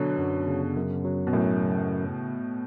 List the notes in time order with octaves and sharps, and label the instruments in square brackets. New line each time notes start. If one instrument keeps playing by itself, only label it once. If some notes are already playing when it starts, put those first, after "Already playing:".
Already playing: [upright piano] B2 D3 [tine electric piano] F#3
[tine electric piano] F#2
C#3
F#2
F#3
[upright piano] B2
[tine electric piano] F#2 [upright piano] A2
[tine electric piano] C#3